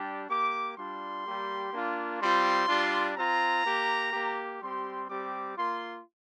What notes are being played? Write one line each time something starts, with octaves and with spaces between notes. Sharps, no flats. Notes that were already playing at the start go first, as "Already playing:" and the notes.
Already playing: G3 D4 G4
A#3 G4 D6
G3 D4 F4 C6
G3 A#3 G4
A#3 D4 F4
G3 C4 F4 C6
G3 D4 F4
C4 F4 A#5
A#3 G4
A#3 G4
G3 C4 G4 C6
G3 C4 G4 D6
A#3 F4 C6